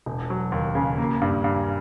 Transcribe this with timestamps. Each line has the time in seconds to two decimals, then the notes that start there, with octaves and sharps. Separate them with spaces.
0.06 E1
0.30 F#3
0.52 D#2
0.75 C#3
0.98 A#3
1.21 G2
1.44 G2